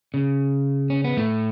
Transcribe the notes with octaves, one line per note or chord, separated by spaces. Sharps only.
C#3
C#4
B3
A2 A3